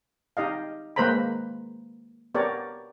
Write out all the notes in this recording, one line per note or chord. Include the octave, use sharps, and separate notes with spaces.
D#4 G4 D#5 F5
G#3 A#3 B4 C5 A#5 B5
B3 G4 A#4 C#5 D5